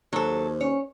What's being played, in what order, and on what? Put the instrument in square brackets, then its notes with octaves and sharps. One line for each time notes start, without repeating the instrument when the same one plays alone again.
[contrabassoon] D#2 [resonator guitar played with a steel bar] F#3 A4 [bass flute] C5
[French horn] C#4 [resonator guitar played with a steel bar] C#5